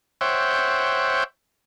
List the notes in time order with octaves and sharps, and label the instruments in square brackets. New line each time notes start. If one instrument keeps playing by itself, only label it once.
[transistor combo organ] C5 C#5 E5 F#5 G5